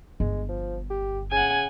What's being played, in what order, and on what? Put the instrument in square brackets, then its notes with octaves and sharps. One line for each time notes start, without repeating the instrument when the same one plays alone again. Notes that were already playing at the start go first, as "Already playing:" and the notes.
[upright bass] G1 [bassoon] G#3
[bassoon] F3
G4
[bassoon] C#3 [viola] F#5 G#5